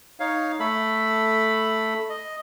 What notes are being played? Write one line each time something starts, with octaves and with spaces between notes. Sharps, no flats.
D#4 C#5 F5
A3 A4 B5
D#5